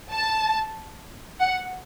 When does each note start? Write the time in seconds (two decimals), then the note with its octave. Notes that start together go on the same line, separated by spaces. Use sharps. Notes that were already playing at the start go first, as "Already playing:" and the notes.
0.14 A5
1.41 F#5